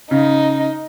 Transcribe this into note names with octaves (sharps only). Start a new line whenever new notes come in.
C#3 D#4